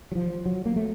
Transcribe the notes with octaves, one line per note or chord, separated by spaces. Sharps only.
F#3
F3
F#3
A#3
A3